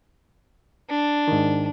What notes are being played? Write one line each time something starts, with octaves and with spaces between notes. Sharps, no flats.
D4
G#2 D#3